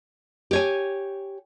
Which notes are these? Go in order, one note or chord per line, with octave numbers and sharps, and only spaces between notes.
G4 C#5 G#5